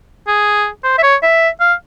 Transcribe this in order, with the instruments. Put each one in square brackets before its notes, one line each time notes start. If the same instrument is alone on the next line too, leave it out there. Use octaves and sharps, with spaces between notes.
[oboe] G#4
C5
E5
C#5
E5
F5